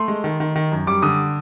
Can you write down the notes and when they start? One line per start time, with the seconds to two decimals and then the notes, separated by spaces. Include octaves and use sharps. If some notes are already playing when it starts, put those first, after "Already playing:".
Already playing: A3 C6
0.08 G#3
0.24 D#3
0.40 D#3
0.56 D#3
0.72 F#2
0.87 G3 D6
1.03 D3 D#6